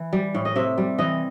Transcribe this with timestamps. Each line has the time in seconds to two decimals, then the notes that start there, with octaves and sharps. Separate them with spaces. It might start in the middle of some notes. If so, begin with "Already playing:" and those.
Already playing: E3
0.13 G3
0.35 A2
0.45 D#5
0.56 C3 E5
0.78 G3
0.99 E3 D#5